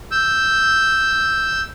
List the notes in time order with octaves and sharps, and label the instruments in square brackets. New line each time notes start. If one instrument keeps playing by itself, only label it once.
[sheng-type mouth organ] E6 G6